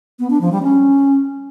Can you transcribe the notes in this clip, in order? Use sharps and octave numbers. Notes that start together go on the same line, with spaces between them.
B3
D4
F3
G3
C#4